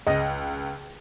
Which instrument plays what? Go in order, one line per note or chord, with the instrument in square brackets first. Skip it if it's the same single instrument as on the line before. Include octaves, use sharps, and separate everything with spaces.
[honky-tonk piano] C#2 [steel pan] D#5